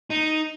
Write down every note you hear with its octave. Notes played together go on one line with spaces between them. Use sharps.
D#4